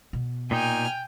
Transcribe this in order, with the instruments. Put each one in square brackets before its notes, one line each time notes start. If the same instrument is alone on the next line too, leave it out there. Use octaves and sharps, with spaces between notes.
[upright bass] B2
[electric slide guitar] A#2 D#4 [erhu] G5 [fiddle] G#5 F6